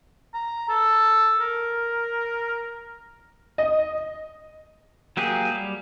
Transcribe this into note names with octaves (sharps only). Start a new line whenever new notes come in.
A#5
A4
A#4
D#5
F#3 A#3 G4 G#4
G3